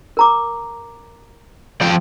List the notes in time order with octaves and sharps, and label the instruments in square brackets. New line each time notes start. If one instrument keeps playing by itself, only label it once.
[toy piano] A#4 A#5 D6
[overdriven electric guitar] F3 G5